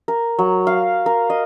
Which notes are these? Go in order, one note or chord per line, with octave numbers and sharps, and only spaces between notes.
A#4
F#3
F5
A#4
D#5